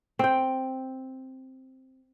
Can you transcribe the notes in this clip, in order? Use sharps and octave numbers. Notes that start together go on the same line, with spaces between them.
C4 G5